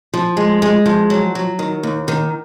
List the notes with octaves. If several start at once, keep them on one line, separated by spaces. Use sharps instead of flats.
F3
G#3
G#3
F3
F#3
F#3
D#3
D#2
D#3